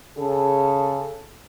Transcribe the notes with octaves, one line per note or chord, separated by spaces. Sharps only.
C#3 G#4 A4